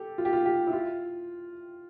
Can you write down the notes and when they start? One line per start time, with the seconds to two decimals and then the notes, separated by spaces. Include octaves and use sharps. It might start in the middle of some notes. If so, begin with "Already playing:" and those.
Already playing: G4 A4
0.18 F4
0.25 G4
0.33 F4
0.46 G4
0.67 E4
0.73 F4